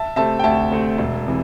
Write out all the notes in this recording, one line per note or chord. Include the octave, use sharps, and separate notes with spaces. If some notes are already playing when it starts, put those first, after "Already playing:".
Already playing: E5 A5
C3 A3 C4 E5 A5
G5
D2 E5 A5
C3 A3 C4
E1
C3 E3